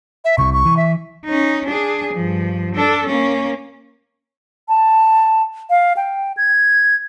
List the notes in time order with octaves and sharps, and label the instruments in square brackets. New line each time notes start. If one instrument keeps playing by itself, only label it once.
[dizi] E5
[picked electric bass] C2 C3 [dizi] C#6
[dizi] C#6
[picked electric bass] E3
[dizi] E5
[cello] C#4 D#4
D4 G#4
G2 F3
D4 A4
A#3 C#4
[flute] A5
F5
G5
G#6